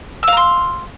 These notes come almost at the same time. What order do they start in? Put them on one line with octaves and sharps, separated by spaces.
E6 F5 A#5 C6